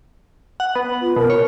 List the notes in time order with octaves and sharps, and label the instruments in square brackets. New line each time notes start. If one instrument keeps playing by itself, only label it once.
[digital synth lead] F#5
B3
[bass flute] F4
[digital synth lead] B2 [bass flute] A#4
[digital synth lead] C#5